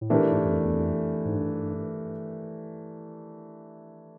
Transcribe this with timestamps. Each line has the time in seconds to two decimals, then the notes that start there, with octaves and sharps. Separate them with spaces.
0.01 A2
0.10 A#2 E3 A3 D4 G4 A#4
0.32 G#2
0.45 F#2
0.52 F2
0.65 E2
0.74 F2
1.25 G#2
1.36 G2